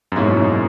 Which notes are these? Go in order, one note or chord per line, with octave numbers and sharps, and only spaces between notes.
F#2
G#2 B2 A#3 C#4 E4
F#2